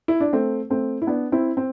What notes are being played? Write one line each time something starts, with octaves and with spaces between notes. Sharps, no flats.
E4
D4
A3 C4
A3 C4
E4
B3 D4
C4 E4
C4